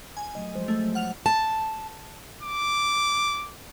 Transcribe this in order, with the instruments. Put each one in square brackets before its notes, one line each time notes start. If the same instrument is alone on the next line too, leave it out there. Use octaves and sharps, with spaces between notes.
[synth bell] G#5
[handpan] F#3 A3 D#5
F3 G#3 C5
[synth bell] A3
[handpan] F#3
[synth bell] F#5 F6 F7
[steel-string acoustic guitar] A5
[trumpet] D6